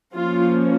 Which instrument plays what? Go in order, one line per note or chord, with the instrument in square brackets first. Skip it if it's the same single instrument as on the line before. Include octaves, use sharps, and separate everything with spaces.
[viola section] F3 A#3 C#4 F4